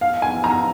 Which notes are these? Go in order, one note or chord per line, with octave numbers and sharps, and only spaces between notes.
F5
G#5
A#5